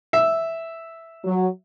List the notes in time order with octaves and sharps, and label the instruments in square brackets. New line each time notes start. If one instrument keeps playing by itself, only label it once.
[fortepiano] E5
[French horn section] F#3